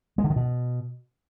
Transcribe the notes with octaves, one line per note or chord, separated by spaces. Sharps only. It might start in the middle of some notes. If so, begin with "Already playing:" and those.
G#3
D3
D#3
B2